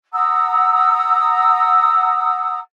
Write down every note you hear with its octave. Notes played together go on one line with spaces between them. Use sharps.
F#5 A#5 D#6 E6